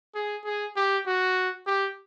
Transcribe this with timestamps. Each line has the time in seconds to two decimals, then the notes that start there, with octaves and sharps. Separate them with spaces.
0.15 G#4
0.44 G#4
0.76 G4
1.06 F#4
1.66 G4